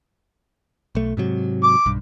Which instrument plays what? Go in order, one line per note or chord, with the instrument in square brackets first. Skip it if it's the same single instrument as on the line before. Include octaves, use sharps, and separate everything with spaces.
[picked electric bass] B1 A3
G#2 C3 F#3
[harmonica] D6
[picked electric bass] B1 G2